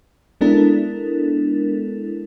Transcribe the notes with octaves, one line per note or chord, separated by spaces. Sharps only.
G#3 B3 D4 E4 A4 A#4